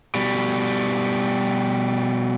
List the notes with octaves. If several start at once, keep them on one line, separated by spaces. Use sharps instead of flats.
B2 G3